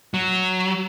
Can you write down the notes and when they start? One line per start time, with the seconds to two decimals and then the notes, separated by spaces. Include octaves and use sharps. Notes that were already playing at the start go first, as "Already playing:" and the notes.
0.14 F#3